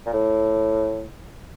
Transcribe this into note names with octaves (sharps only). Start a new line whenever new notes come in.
A#2
A2